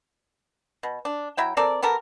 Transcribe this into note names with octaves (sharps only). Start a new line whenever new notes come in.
B2
D4
F#3 E4 G5
C4 A4 A#4 D5
B3 G4 A4 A#4